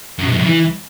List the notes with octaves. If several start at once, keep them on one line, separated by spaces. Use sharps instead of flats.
F#2
B2
F#2
F2
E3